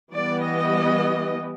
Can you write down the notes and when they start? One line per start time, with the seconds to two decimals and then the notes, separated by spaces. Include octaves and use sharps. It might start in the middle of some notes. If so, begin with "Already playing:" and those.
0.12 E3 G3 B3 D5
0.43 D#5